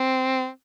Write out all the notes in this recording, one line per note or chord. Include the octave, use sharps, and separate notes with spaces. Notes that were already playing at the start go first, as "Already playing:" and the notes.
Already playing: C4